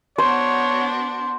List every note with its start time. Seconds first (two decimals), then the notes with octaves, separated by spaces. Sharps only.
0.18 B3 D4 F#4 C5 C#5